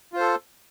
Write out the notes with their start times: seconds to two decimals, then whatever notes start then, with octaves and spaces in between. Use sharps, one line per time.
0.13 F4
0.17 C5
0.20 A4